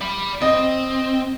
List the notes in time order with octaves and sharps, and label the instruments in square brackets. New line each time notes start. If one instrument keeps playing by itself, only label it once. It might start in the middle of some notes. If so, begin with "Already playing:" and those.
[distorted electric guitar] D5 B5
[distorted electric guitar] C4 [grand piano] D#5